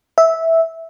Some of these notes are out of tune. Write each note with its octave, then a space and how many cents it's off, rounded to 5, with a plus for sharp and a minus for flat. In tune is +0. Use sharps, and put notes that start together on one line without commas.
E5 -10